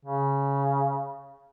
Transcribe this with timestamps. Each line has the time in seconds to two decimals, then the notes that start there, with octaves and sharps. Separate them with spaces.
0.05 C#3